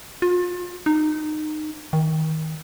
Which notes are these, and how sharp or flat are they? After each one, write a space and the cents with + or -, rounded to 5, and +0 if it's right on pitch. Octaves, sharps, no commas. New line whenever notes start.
F4 +35
D#4 -20
D#3 +25